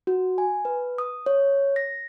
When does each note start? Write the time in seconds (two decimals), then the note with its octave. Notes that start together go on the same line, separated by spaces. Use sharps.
0.07 F#4
0.38 G#5
0.65 B4
0.98 D#6
1.26 C#5
1.76 A#6